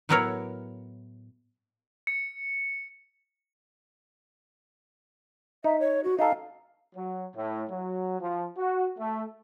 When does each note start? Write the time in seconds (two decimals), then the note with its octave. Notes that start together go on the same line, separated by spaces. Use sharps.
0.09 A2 F#3 B3 E4 A#4 C#5
2.07 C#7
5.64 D#4 E5
5.80 C#5
6.04 F#4
6.19 D#4 A4 F5
6.96 F#3
7.35 A2
7.70 F#3
8.20 F3
8.58 F#4
8.98 A3